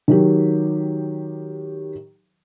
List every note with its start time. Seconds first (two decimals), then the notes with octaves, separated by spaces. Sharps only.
0.08 D#3 F#3 G4